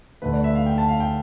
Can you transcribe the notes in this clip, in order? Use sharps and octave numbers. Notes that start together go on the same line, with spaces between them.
D2 D3 A3 B4
D5
E5
F5
G5
A5
F5
G5